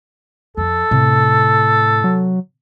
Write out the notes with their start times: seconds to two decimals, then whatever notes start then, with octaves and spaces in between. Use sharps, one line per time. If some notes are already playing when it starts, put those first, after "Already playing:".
0.57 F2 A4
0.91 A2 C3
2.04 F#3